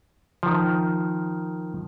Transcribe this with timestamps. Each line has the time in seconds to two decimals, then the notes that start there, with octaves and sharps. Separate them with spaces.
0.43 D#3 F3